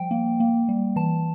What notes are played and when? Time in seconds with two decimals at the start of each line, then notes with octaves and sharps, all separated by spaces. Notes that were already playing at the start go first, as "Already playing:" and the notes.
Already playing: F3 G3 G5
0.11 A#3
0.40 A#3
0.69 G3
0.96 E3 A5